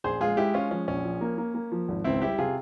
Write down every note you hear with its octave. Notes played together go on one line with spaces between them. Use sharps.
A#1 G#4 C5
G#3 F4 G#4
G#3 E4 G4
G#3 C#4 F4
F3 C#4
A#1 C#4
F3
A#3
A#3
A#3
F3
G#1
C#2 C4 E4
G3 E4 G4
C3 F4 G#4